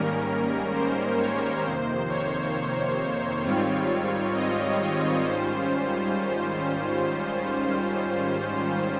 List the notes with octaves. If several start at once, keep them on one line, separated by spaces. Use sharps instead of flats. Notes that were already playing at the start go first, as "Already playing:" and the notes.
Already playing: G#2 D#3 G3 A#3 C#4 A#4
C5
C#5
F2 C3 D#3 A#3 C5
C#5
G#2 D#3 G3 C4 F4
D#5
C#5
G#2 D#3 G3 C#4 F4 C5